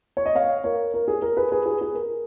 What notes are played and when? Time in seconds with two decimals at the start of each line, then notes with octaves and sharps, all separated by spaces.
0.17 C#5
0.26 D#5
0.35 C#5 F5
0.64 A#4 C#5
0.94 A#4
1.08 G#4
1.22 A#4
1.37 G#4 B4
1.52 G#4 B4
1.66 G#4 B4
1.81 G#4
1.95 A#4